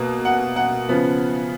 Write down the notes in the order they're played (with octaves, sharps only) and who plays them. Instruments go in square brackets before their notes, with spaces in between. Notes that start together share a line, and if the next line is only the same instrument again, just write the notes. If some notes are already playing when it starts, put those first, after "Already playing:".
Already playing: [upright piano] B2 A#3
F#5
F#5
C#3 F3 B3